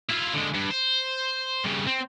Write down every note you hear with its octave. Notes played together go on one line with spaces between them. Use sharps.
E4 F4
D3 G#3
G2
C5
G2 C#3
C4